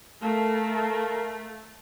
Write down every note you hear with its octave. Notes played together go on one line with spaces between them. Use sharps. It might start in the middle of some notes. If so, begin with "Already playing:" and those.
A3 A#4 F5 A5